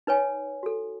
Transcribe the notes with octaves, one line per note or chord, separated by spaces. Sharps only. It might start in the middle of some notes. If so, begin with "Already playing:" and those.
D#4 B4 C#5 G#5
F#4 A4